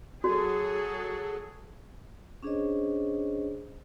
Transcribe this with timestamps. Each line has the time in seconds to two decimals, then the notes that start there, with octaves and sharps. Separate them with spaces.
0.24 F#3 F#4 G#4 A4
2.43 C#4 D4 G#4 C5 C#5 D#5